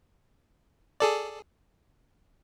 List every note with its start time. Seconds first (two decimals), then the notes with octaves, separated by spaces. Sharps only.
1.00 G#4 A4 D5